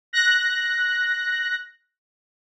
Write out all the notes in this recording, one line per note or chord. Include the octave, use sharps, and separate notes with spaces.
F#6 A#6